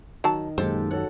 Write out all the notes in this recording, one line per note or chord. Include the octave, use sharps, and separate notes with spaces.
D#3 F#3 A5
F#2 A#2 D#3 G#3 G4 A4 C5
F#4 A4 C#5 F#5